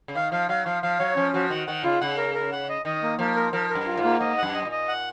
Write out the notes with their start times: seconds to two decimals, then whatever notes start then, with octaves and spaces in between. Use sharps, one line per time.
0.08 C#3
0.15 D#3 F5
0.32 F3 F5
0.49 F#3 F5
0.66 F3 F5
0.83 F3 F5
0.99 F#3 C#5
1.16 F3 C#4
1.34 F3 F#4
1.50 D#3 F#5
1.67 D#3 F#5
1.84 C#3 F4
2.01 C#3 F#5
2.17 A#4
2.35 A#4
2.52 F#5
2.69 D#5
2.85 D#3 D#5
3.03 A#3
3.19 F3 A#3
3.36 A#4
3.53 F3 A#4
3.70 A#4
3.75 F#2
3.86 F4
3.97 G#2
4.04 A#3
4.21 G#2 D#5
4.38 F#2 F#5
4.54 D#5
4.65 A#2
4.71 D#5
4.88 F#5